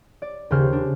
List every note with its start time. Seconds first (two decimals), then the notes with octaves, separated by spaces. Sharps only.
0.22 D5
0.50 D#2 C#3 C5 F6
0.73 D4